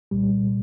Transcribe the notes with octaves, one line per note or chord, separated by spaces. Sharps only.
C2 A#2 G3